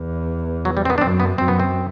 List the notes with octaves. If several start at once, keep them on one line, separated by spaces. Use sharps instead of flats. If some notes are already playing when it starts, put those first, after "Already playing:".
Already playing: E2
F#3
G3
C4
B3
D4
F#2 C4
B3
F#2 C4
B3
C4